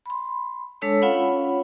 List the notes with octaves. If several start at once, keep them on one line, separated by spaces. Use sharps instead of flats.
B5 C6
G#3 D4 A4 C#5 A5 E6
C#4 F4 C#5 F5 F#5 B5